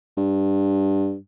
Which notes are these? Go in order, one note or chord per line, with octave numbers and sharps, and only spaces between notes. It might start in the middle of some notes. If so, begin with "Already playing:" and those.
G2